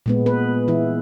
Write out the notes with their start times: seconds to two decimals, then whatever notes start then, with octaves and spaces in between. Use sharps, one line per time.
0.06 A#2 G#3 B3
0.26 B3 B4
0.68 E3 E4